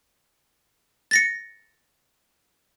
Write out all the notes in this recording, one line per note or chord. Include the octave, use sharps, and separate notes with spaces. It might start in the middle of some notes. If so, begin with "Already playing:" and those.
A6 A#6 C#7